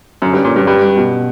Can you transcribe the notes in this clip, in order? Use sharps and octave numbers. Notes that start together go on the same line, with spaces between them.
F#2 D3
G2
C#4
A#2
G2 F#3
G2 G3
G3
B2